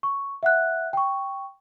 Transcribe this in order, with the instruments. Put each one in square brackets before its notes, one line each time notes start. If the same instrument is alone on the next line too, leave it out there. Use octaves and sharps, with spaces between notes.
[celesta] C#6
E5 F#5 F#6
G5 C#6